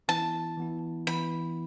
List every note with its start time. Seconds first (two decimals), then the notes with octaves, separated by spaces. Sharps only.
0.08 E3 B3 E4 A5
0.57 E3 B3 E4
1.07 E3 B3 E4 B5